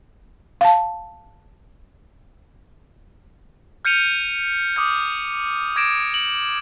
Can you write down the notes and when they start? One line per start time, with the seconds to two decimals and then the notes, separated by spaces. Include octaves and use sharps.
0.61 F5 A5
3.85 F6 G6 C#7 D#7 F7 G7
4.76 D6 D#6 F6 G6
5.76 D6 G#6 A#6 D7 E7
6.14 F#7